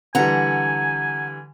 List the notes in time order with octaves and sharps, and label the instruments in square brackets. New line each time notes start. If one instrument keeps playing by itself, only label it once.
[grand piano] D3 E3 G3 [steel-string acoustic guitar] F#5 A#5 [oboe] G#5